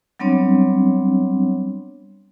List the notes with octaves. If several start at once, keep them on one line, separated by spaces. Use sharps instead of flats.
F#3 G3 B3 C4 D4 C#5